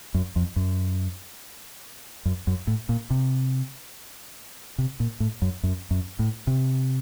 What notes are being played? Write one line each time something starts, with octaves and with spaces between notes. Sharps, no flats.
F#2
F2
F#2
F#2
F#2
A2
A#2
C3
C3
A#2
A2
F#2
F#2
F#2
A2
C3